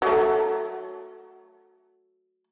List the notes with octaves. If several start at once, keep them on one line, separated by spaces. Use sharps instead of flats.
F#3 A3